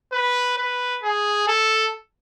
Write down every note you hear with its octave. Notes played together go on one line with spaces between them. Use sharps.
B4
B4
G#4
A4